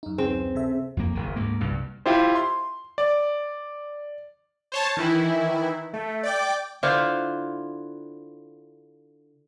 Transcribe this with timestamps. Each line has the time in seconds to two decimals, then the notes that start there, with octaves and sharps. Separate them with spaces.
0.03 F#2 D#4
0.18 D2 C4 C#4 G#4
0.55 C3 A4 E5
0.97 F2 A#3
1.15 F#1 D#3
1.36 D2 G#2 A#3
1.60 C2 G2 B2
2.06 E4 F4 G4 C5
2.35 C6
2.98 D5
4.72 C5 C#5 A5
4.97 D#3 E3 E4
5.94 A3
6.23 D5 G5 D6
6.83 D3 E4 F4 C5